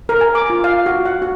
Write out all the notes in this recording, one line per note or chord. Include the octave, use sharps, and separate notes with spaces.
A#4
G#5
D6
F4
F5
F#4
F#5
F#4